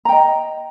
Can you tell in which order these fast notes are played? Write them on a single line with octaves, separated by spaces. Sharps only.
A#5 G5 D#5